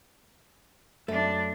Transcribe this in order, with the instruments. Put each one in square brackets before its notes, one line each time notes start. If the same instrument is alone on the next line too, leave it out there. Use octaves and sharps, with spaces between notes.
[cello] F#2 D4 [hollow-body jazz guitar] A3